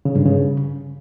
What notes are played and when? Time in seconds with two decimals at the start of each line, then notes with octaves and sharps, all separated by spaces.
0.05 C#3
0.16 G2
0.26 C#3